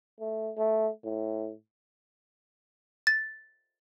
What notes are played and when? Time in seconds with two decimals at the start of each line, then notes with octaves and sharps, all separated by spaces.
0.20 A3
0.57 A3
1.04 A2
3.07 A6